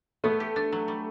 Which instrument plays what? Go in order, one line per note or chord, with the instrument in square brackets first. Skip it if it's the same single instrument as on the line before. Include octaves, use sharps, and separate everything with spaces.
[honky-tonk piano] A3 [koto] B3
[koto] G4
D4
F#3
G3